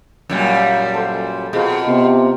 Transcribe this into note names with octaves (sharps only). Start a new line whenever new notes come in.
F#2 A#2 G3
A4 C5
B2 C4 F4 G#4 A#4
C3 B3